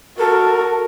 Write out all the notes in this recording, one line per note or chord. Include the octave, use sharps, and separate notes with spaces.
F#4 A4 A#4